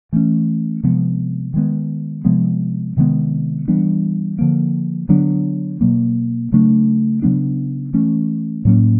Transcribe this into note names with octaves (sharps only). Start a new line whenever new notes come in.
E3 A3 C#4
C3 F3 G#3 B3
D#3 G#3 B3
C3 F3 G#3 B3
C3 D#3 G#3 B3
E3 G3 B3 D4
D3 F3 A#3
D3 F#3 B3 D4
B2 F#3 A#3
C#3 F#3 A3 D4
C#3 F#3 B3 D4
E3 A3 C#4
A2 F#3 A#3 C#4